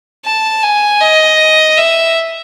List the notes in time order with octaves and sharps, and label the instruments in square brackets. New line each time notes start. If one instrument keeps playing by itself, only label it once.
[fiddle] A5
G#5
D#5
E5